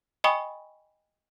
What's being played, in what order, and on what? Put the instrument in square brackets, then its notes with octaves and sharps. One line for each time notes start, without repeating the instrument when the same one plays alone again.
[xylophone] D#5 G5 G#5 B5 C#6 D#6